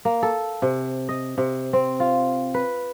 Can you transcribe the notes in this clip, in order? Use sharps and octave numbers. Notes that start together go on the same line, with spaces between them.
A#3
A4
C3
D#5
C3
C4
F4
B4